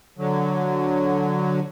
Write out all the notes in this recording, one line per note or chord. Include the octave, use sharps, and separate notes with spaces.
D3 F#3